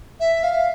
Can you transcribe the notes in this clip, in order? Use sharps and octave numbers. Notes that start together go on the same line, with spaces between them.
E5
F5